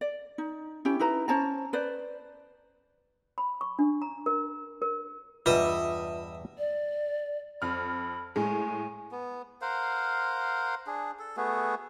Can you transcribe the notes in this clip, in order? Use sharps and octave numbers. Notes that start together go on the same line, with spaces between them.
D5
D#4
C#4 E4 G4
D#4 E4 B4 A#5
C#4 C5 A5 A#5
B4 C5 D5
B5
C#6
D4
A#5
A#4
A#4
E2 G2 G3 F4 B4 D#5 E5 D#6
D5
F2 B5 F6
A2 G#3 G#5
B3
A#4 C5 F5 F#5
D4 G#4
A4
A3 B3 F#4 G#4